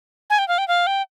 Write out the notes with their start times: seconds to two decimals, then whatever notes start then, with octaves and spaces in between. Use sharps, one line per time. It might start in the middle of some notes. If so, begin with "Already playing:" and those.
0.30 G#5
0.39 G5
0.48 F5
0.58 G5
0.68 F5
0.87 G5